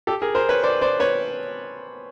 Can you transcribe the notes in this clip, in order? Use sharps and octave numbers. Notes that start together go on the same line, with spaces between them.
G4 A4
G#4 A#4
A#4 C5
B4 C#5
C5 D5
C5 D5
B4 C#5